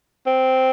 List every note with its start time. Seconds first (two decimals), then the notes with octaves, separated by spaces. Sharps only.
0.26 C4